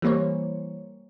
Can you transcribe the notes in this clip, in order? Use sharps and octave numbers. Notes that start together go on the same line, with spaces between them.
E3 G3 A#3 C5 C#5